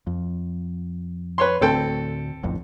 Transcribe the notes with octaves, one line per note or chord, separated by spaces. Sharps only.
F2
B4 C#5 C6
D2 A2 C4 A4 G5
D1 A1 F2